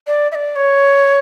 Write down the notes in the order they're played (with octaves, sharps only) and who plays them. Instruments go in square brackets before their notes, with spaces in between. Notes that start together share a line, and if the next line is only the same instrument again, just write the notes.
[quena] D5
E5
D5
C#5